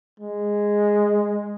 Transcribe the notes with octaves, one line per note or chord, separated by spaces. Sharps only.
G#3